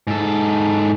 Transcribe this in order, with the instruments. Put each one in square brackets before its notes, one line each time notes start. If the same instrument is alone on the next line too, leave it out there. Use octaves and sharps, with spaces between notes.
[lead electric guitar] G#2 A4